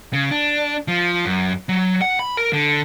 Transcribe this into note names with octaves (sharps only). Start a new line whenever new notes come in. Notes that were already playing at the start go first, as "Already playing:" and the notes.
C#3
D4
F3
F#2
F#3
F#5
B5
A#4
D3